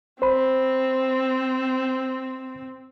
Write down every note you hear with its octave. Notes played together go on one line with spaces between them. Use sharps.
C4 C5 B5